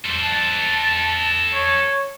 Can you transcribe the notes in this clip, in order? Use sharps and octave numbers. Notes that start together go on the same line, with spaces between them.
A4 C5
A5
C#5